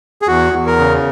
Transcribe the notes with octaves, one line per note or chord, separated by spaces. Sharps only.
G#4
E2 F#4
E2
A#4
C#3